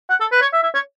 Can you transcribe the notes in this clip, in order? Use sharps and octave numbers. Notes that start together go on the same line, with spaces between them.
F#5
A4
B4
C#5
E5
E5
C#5